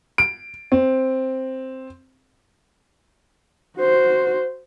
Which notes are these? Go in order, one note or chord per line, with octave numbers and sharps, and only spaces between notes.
D7
C4
F#4 C5